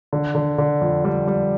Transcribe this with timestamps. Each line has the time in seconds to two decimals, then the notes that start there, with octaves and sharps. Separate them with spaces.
0.13 D3
0.35 D3
0.58 D3
0.81 F2
1.04 G3
1.27 G3